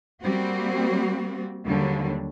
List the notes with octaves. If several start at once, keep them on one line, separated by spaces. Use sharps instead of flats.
G3 A#3 C4 F#4
D#2 D3 F#3 G3